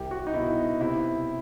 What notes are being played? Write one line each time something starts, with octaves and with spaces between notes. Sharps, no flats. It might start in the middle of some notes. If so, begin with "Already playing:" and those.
Already playing: C2 G4
F#4
D#4
B2 E4
C3 E4